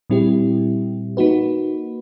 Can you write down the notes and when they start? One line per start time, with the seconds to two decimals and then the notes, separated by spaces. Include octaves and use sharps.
0.10 A#2 G3 C4 E4 G4
1.17 A#3 D#4 F#4 B4